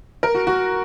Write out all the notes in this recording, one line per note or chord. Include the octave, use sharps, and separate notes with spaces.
A#4
F#4
F#4